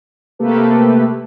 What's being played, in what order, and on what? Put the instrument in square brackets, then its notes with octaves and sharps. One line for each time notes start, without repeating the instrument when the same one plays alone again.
[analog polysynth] C3 A3 A#3 G4 A4 B4